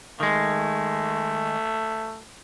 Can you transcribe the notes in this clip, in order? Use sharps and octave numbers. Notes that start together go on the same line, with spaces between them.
D#3 G#3 A3